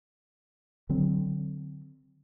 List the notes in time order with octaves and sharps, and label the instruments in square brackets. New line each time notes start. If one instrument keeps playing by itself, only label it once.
[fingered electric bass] D3 F#3 C4